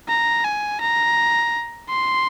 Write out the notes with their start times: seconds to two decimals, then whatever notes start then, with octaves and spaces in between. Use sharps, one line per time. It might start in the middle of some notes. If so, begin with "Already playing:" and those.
0.08 A#5
0.44 G#5
0.81 A#5
1.89 C6